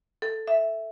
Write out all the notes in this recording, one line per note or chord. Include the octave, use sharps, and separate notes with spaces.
A4
E5